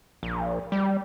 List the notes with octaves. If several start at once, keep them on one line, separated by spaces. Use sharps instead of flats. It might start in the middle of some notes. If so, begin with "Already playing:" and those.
A#1
G3